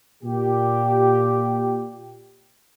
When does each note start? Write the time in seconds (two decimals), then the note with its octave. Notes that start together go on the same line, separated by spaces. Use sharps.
0.23 A#2 G4